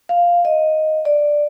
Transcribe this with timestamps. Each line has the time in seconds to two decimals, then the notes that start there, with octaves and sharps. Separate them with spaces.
0.09 F5
0.45 D#5
1.05 D5